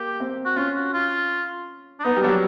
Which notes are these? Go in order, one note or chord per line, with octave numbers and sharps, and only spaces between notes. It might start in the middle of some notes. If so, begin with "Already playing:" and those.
Already playing: A#3 G4
C4
F#4
C#4 F4
F#4
F4
D4
B3 D#4
G3
F#3 D4
G3